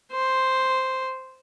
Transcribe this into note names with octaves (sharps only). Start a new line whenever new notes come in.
C5